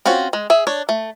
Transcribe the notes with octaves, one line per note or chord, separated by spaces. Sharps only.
C4 C#4 F4 F#4
G#3
G#4 E5
D4 C#5
A3